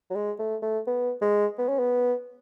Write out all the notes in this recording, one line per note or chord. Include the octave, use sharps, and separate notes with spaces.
F#3
G#3
A3
A3
B3
G#3
B3
C#4
B3